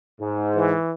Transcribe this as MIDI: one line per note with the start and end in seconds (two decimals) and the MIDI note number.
0.21 0.73 44
0.56 0.94 52